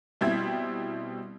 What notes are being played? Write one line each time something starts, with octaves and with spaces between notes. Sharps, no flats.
B2 G3 C4 E4 E5 G#6